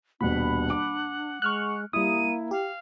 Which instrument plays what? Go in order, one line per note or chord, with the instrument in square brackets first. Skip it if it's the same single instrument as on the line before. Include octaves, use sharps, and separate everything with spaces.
[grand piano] D#1 B2 [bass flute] D4 [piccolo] F#5 [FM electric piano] B5
[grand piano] D6
[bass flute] G#3 [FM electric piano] C#6 F6 F#6
[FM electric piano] G3 D#6 [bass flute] A#3 [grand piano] E4 [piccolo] D#7
[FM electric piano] G4 [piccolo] F5